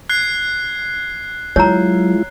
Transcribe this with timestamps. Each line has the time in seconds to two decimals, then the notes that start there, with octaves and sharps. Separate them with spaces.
0.09 F#6 G#6 C7
1.56 F#3 G#3 E4 F4 C#5 A#5